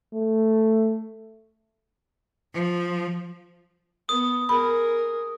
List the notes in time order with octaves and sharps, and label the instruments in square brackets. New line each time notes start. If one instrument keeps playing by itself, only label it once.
[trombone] A3
[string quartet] F3
[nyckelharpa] B3 [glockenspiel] D#6
[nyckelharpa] G#4 A#4 [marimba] B5